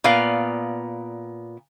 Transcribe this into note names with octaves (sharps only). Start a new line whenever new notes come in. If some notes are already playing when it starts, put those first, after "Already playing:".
A#2 B3 D5 F5